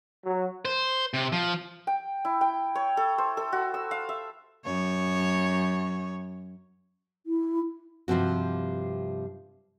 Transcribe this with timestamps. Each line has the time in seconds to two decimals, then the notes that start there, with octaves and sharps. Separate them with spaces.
0.25 F#3
0.65 C5
1.14 C3
1.32 F3
1.87 G5
2.25 E4
2.41 G5
2.75 C#5
2.97 A4
3.18 C5
3.37 A4
3.53 F#4
3.74 E6
3.91 F5
4.09 E5
4.65 F#2 C#5
7.26 E4
8.08 G2 C3 F3 C4 F#4